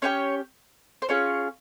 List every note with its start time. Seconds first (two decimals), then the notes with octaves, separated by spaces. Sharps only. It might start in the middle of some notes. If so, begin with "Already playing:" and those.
0.02 C#4 E4 G4 C#5
1.02 C5
1.09 C#4 F4 G#4 C#5